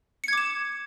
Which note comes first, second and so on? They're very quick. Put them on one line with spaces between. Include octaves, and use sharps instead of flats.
C#7 G#6 D6 E7